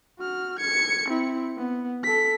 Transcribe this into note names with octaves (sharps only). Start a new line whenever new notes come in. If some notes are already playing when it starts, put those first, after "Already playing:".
F#4 F6
G#6 C#7
C4 E4
B3
A4 B6